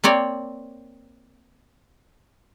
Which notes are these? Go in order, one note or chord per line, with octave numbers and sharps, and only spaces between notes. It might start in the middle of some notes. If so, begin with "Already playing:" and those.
A#3 C4 C#5 D5